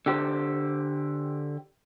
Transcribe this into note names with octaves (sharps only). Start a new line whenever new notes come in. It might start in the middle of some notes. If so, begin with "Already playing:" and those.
D3 G4 C5